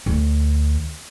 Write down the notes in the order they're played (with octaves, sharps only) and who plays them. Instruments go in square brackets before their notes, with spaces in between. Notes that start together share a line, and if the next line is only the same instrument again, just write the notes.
[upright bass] D2